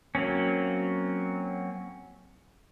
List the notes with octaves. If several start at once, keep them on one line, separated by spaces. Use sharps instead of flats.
F#3 A#3 C4 C#4